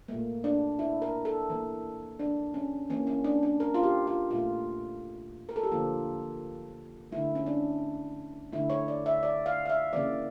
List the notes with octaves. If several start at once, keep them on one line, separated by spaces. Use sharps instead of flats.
A#2 A3 A#3
D4
E4
A#4
A4
E3 A#3
D4
C#4
E3 A#3 C#4
C#4
D4
D4
A#4
F4
G4
F4
A#2 A3 F4
A#4
A4
G4
D3 F3 A#3 F4
D3 A3 E4
C#4
D4
D3 A3 E4
C#5
D5
E5
D5
F5
F5
E5
C#3 E3 A#3 D5